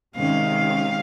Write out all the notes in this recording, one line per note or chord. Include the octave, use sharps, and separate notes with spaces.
C3 D#3 G#3 C#4 F5